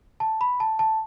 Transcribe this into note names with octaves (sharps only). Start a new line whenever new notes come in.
A5
B5
A5
A5